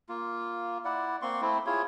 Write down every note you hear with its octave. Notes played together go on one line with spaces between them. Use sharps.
A#3 F4
E4 D5 F#5
A#3 C4 C6 C#6
A3 C4 E4
E4 F4 G#4 C#5